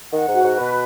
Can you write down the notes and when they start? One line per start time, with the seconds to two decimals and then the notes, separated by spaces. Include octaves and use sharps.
0.12 D#3 F#5
0.28 G#2
0.33 F#4
0.44 G#2
0.55 B4
0.60 B2